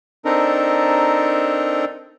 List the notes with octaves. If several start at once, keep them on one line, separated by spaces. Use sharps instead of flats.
C4 D4 D#4 A4 A#4